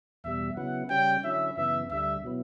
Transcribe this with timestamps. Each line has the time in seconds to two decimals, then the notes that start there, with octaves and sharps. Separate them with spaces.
0.24 E2 B2 G3 E5
0.56 C#3 F#3 B3 E4 F#5
0.90 C#3 G3 C#4 G5
1.23 D3 F#3 C#4 E4 E5
1.57 F#2 C#3 E3 B3 E5
1.90 D2 D3 G3 E5
2.24 B2 F#3 B3 E4